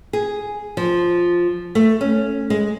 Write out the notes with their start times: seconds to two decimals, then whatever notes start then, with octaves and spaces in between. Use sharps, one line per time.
0.13 G#4
0.77 F3
1.75 A3
2.01 C#4
2.50 G#3